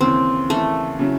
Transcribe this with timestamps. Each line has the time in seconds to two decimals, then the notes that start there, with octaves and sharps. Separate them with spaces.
0.01 D#2 C#3 E3 C4
0.49 D#2 C#3 E3 A3
0.99 C#3 F#3 C#4 E4